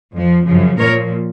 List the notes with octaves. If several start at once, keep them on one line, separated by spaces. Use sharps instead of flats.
F2 F3
F#2 C#3 F3
A#2 F3 A#4 C#5